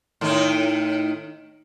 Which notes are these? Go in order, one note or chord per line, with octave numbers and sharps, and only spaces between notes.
A2 D#3 D#4